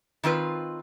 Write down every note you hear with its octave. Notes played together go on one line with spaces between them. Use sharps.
D#3 C4 F4 B4